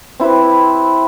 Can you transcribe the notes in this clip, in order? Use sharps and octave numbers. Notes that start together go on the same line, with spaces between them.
C4 E4 G4 B4